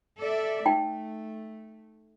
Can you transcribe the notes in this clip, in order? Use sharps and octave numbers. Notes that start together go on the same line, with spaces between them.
A4 D5 E5
A3 D#4 G5